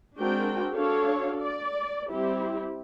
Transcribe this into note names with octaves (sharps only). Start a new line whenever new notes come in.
G#3 C4 D4 F#4 A#4 G5
D4 F#4 A4 C#5 F5
D5
G3 C4 E4 G4